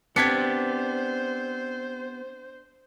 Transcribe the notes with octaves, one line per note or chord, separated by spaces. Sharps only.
B3 C4 D4 G4 C5 G#6 B6 C#7